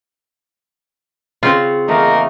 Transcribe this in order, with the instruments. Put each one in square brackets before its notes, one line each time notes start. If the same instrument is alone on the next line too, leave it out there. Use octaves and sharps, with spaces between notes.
[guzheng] C#3 [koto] C4 F4
[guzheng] E2 A3 G#5 [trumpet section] A#3 D#4 A#4